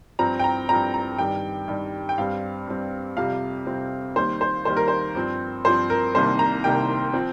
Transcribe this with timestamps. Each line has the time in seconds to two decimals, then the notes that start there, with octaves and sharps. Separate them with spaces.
0.19 G2 F3 C4 A#5
0.39 G5
0.44 A#5
0.69 G2 F3 C4 A#5
0.94 A#5
1.18 G2 D#3 G3 G5
1.68 G2 D#3 G3
2.09 G5
2.18 G2 G3 C4 F5
2.67 G2 G3 C4
3.17 F2 C3 G3 C4 F5
3.66 F2 C3 G3 C4
4.16 D#2 D#3 G3 C5
4.41 C5
4.65 D#2 D#3 G3 C5
4.77 A#4
4.88 C5
5.15 G2 F3 C4
5.65 G2 F3 C4 C5
5.90 A#4
6.14 C2 C3 D#3 G3 A#3 C5
6.39 A#5
6.64 C2 C3 D#3 G3 A#3 G5
7.14 F3 C4